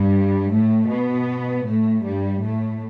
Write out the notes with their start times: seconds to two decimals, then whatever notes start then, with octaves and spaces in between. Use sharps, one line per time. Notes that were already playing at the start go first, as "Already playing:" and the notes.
Already playing: G2 G3
0.53 A2 A3
0.90 B2 B3
1.66 A2 A3
2.04 G2 G3
2.42 A2 A3